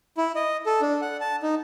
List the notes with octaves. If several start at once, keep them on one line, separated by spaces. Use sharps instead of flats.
E4
D#5
A4
D4
F#5
A5
D#4